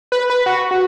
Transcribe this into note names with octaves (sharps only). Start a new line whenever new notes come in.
B4
B4
F#4
F#4